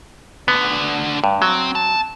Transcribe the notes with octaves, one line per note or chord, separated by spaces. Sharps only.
D2 D3 B3
G2
F#3 C4
A5